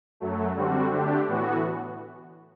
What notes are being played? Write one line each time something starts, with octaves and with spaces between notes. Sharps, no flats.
F#2 F#3 A3
D3 G3 C4 F#4
D3 A3 D4 G4
A2 E3 B3 F#4